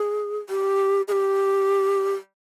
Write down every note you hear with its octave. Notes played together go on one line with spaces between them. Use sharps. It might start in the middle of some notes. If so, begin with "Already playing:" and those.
Already playing: G#4
G4
G#4
G4